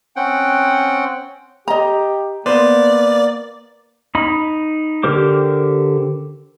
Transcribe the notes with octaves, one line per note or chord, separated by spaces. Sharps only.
C4 C#4 F#5 G5
G4 D#5 A#5
A#3 B3 C5 D5
D#4 B5
D3 G4 A#4 C5 D6